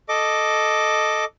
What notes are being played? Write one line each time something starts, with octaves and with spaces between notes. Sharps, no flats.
A4 D#5 D6